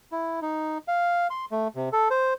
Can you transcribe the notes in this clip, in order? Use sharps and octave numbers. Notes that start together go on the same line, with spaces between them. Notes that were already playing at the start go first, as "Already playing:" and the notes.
E4
D#4
F5
C6
A3
C3
A4
C5